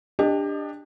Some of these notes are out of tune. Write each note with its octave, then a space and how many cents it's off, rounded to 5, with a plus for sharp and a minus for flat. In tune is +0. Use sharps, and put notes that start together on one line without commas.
D4 +0 G4 +25 D#5 -15